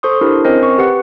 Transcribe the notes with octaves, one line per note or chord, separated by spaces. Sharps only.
A4 C5 C6 C#6 D#6
D4 E4 G4 A#4
C4 C#4 A#4 C5 D#5
C#6
G4 B4 F#5